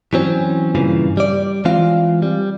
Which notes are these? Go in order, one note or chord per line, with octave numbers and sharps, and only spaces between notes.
E3 F#3 C4 C#4
G2 A#2 C#3 E3
G3 D5
E3 G#3 C4 F4 F5
G3